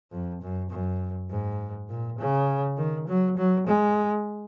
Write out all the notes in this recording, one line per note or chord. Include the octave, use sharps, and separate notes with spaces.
F2
F#2
F#2
G#2
A#2
C#3
D#3
F#3
F#3
G#3